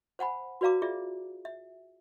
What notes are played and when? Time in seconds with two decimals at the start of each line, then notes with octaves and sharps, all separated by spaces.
0.19 C5 F#5 G#5 B5
0.61 F#4 B4 D5 F5 A#5 D6
0.82 F4 G#4 D5 E5
1.45 E5